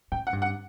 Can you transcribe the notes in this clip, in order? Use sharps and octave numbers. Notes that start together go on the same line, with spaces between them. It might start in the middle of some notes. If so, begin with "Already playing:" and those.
A2 G5
F#5
G2
F#5